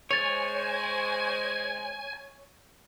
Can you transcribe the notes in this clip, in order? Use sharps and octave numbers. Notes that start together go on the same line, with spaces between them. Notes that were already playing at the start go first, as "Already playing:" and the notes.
G#3 C5 C#5 G#5 A6 F7